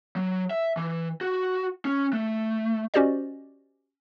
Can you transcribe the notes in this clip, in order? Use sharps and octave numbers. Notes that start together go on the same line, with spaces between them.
F#3
E5
E3
F#4
C#4
A3
C#4 F#4 G4 C5 D5 D#5